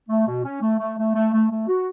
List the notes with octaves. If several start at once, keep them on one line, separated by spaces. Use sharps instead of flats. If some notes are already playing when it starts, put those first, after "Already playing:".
A3
B2
C#4
A3
A3
A3
A3
A3
A3
F#4